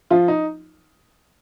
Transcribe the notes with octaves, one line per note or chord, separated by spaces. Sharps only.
F3 F4
D#4